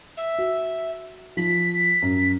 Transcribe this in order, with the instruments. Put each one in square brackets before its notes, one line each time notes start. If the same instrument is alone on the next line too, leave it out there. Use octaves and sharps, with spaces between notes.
[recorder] E5
[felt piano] F#4
[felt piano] F3 [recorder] B6
[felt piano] F#2